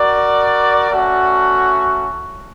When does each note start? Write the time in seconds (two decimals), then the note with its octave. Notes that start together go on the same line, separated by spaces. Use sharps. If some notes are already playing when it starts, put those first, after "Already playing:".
Already playing: F#4 A#4 D5
0.90 A3 C#4 F#4